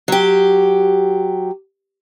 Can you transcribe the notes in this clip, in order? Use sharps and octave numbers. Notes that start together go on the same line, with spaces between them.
F#3 G4